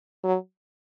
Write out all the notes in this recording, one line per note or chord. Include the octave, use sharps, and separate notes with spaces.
F#3